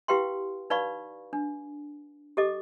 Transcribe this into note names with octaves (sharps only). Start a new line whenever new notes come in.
E4 G4 B4 F5 G5 C6
D#4 B4 D5 F5 B5 C#6
D4
G4 A4 D#5 D6